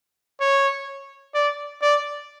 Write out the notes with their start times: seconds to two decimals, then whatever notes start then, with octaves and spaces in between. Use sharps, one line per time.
0.40 C#5
1.34 D5
1.82 D5